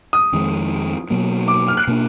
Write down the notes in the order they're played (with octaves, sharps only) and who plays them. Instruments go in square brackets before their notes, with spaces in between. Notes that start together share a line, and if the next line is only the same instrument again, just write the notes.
[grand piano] D#6
[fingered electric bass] F2 D#3 G#3
B2 F#3 A#3
[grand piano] D6
F6
F#6
[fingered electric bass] B2 A#3 D4